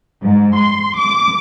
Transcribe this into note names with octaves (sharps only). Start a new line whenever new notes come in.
G#2
C6
D6